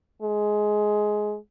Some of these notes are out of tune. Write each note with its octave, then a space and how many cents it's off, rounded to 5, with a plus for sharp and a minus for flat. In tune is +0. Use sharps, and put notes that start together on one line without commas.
G#3 +15